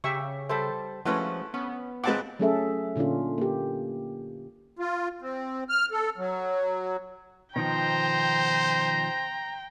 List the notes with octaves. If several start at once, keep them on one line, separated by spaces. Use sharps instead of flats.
C#3 G4 E5 C#6
G3 A4 C5 E5
F3 G#3 A3 C#4 E4 F#4 B4
B3 C#4
A#2 G#3 C4 B4 F#5 A5 D6
F#3 A3 C#4 G#4 A4 E5
A#2 D3 C#4 D4 F4
A#3 G4
F4
C4
F6
A4
F#3
B2 D#3 F3 C5 G5 A#5